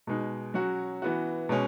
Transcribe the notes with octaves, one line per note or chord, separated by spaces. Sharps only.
B2 G#3 D#4
F#3 C#4 F#4
E3 B3 F#4
B2 G#3 C#4